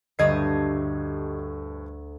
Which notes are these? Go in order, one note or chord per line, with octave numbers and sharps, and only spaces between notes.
D2 G2 G4 D#5 E5 A5 G#6 C7